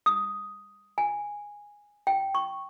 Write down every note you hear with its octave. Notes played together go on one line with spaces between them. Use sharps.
D#6
G#5
G5
C#6